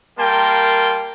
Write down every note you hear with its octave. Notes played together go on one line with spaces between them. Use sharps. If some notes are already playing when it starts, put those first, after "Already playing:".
G3 A#3 A#4 G5 A5 C6